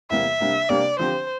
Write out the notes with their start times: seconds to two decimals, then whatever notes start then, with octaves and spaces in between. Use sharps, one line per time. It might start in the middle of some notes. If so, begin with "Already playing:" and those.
0.10 E2 C3 G3 A#3 E5
0.40 C3 G3 A#3 D4
0.69 C3 G3 A#3 D4 D5
0.99 D3 F3 C4 G4 C5